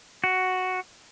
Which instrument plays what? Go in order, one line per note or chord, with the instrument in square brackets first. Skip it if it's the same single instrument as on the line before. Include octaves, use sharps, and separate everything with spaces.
[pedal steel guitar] F#4